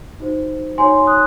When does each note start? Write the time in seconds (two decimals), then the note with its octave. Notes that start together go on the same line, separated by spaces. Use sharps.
0.20 D#4 F#4 C5
0.78 D#4 F#4 C#5 G#5 C6
1.07 D#6 F#6